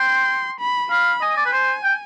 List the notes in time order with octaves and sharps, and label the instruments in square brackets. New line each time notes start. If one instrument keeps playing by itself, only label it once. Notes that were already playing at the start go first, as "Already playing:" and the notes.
Already playing: [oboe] G5 [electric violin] C6
[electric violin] B5
[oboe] F5 [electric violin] B5
[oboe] D#5 [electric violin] G#5
[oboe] D5
B4
C5
G5